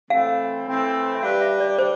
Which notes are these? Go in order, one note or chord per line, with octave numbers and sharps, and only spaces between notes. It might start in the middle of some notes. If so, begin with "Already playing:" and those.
E3 A3 C4 F5
E3 A3 C4
E5
G3 D4 G4 B4 F5
E5
D5
G3 D4 C5